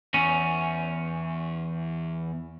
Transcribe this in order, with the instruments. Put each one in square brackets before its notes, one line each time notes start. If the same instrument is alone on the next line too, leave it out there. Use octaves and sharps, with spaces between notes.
[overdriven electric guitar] E2 [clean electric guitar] C#4